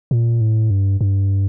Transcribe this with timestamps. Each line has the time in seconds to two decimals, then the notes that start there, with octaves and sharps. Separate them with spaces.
0.11 A#2
0.41 A2
0.70 G2
1.01 G2